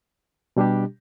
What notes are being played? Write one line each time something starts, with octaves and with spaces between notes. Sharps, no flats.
B2 G3 D4 G4